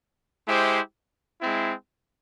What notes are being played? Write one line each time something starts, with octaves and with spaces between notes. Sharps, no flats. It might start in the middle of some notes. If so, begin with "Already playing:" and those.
G#3 E4 G4 C5 E5
G#3 C4 E4